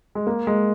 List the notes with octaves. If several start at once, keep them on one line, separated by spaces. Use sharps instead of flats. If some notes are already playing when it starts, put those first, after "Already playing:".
G#3
A#3
G#3